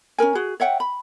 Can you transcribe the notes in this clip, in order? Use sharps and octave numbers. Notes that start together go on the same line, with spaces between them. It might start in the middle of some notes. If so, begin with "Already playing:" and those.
C#4 D#4 A#4 G#5
F#4 G#4
C#5 E5 F#5 G5
B5